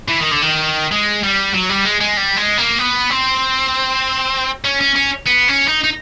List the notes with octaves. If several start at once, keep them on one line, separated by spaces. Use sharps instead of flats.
E3
D#3
D3
D#3
G#3
G3
F#3
G3
G#3
G#3
G3
G#3
A#3
B3
C4
C#4
C#4
C#4
B3
C#4
D#4
D#4